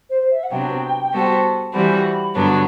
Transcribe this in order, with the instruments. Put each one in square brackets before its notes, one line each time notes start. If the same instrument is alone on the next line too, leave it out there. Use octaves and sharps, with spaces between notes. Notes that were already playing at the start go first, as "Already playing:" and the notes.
[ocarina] C5
E5
F#5
[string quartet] C3 F#3 B3 D4 [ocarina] G5
[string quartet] G3 B3 F#4 A4 C5
[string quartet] E3 G3 C4 F#4 [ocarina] B5
[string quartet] G2 D3 F#3 B3 D4